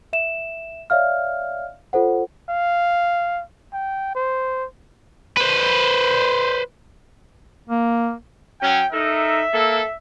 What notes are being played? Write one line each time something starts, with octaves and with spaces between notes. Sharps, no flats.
E5 E7
C#5 D5 E5 F5 F6
F4 A4 C5 F#5
F5
G5
C5
B4 C5
A#3
F#3 C#4 G5
D#4 A4 A#4 E5
A#3 A4